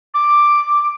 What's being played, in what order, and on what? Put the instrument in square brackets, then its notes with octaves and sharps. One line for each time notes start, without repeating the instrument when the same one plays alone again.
[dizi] D6